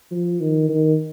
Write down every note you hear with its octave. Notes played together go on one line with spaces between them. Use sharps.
F3
D#3
D#3